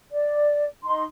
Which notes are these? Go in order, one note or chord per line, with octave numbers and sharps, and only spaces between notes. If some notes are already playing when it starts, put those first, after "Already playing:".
D5
D#4 C6